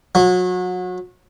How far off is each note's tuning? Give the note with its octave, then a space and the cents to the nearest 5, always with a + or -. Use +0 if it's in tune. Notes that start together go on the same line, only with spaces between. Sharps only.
F#3 -30